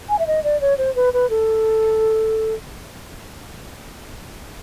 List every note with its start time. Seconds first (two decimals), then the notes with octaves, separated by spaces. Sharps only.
0.09 G#5
0.19 E5
0.27 D#5
0.44 D5
0.61 C#5
0.78 C5
0.96 B4
1.13 B4
1.30 A4